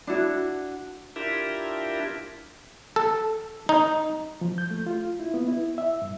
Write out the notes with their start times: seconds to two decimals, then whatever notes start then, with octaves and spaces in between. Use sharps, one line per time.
0.07 D4 E4 F#4
1.16 D4 E4 F4 G4 A#4 E5
2.96 A4
3.69 D#4
4.41 F3
4.58 G6
4.71 A3
4.86 F4
5.20 E4
5.34 B3
5.48 E4
5.78 E5
6.02 G2